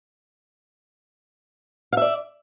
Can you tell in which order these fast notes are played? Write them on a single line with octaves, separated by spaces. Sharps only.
F5 E5 D5